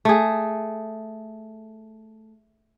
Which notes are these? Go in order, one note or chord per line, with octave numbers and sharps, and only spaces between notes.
A3 G#4